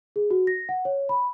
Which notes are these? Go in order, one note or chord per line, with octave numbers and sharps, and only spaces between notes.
G#4
F#4
A#6
F#5
C#5
B5